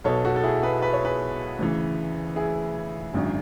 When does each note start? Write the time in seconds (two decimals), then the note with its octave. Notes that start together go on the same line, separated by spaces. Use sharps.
0.04 B1 B2 A4 C#5
0.25 F#4 A4
0.36 A4
0.43 E4 G#4
0.63 G#4 B4
0.82 B4
0.93 C#5
1.05 G#4 B4
1.59 D2 C#3 E3
2.36 E4 G#4
3.14 G#1 F#2 D3